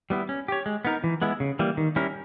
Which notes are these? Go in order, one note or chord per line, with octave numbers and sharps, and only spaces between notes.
G3 B3 E4
C#4
G4 C#5
G#3
B3 D#4 A#4
E3
G#3 B3 E4
C#3
E3 G3 A#3
D#3
G3 C#4 E4 A#4